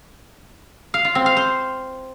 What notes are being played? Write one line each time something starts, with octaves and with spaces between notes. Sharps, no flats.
F5
F4
C4
F5
C5